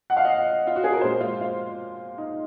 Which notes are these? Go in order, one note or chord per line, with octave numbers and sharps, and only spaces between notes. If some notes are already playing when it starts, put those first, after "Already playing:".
F#5
F5
D#5
F4
F#4
G#4
A#4
A#2 G#3 C5
F4
F4
D#4